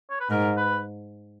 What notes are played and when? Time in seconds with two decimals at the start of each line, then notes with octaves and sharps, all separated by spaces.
0.10 C#5
0.20 B4
0.30 G#2 A#4
0.57 B4